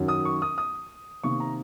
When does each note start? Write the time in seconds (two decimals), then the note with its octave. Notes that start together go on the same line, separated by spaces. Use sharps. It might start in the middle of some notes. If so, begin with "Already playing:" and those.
Already playing: F#2 D#3 F#3
0.08 D#6
0.25 C#6
0.42 D#6
0.58 D#6
1.24 C3 D#3 A#3 C#6
1.40 A#5